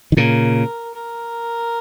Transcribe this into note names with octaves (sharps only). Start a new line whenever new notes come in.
D#3
A#2 C#3 A#4
A#4